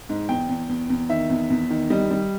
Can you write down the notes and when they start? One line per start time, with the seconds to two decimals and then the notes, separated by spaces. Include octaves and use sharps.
0.09 G#2
0.29 E2 G5
0.49 E2
0.69 E2
0.90 E2
1.10 D#3 E5
1.30 E2
1.50 E2
1.70 D#3
1.90 G3 D#5
2.11 G3